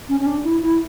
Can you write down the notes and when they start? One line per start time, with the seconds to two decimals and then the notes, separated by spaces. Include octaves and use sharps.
0.09 C#4
0.20 C#4
0.26 D4
0.44 E4
0.63 E4